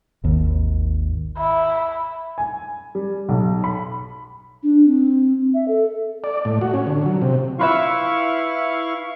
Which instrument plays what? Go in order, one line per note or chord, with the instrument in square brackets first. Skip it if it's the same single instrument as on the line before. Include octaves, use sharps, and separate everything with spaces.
[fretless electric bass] G#1 D#2
[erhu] E4
[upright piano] G#5
G3
B1
B5
[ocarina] D4
C4
E5
A4
[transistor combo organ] D5
A2
F#4
C#4
D3
F#3
C3
[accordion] E4 F5 C#6 [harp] F4 B4 E5